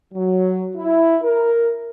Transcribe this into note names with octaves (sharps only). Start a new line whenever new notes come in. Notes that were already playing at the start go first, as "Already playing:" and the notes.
F#3
E4
A#4